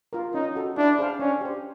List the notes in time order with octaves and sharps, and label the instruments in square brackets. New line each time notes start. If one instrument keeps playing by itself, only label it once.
[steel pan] F4 A#4
[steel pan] C#4 [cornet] D#4
[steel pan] F#4 A4
[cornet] D4 [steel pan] E4
[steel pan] G#4 C5 F5
[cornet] C#4 [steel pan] D4
[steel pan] G4 C5